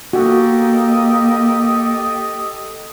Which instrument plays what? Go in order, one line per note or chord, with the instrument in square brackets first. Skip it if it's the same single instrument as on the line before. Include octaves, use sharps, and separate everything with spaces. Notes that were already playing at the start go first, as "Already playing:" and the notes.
[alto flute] A#3 [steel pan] F#4 [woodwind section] G4 A4 D#5